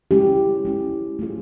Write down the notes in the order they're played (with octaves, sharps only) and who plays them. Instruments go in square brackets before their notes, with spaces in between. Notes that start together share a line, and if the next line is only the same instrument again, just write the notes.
[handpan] G#3 C#4 E4 G4
G#3 C#4 E4 G4
A3 C4 F4 G#4